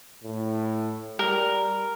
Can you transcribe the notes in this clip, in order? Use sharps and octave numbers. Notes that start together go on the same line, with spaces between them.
A2
G3 A#4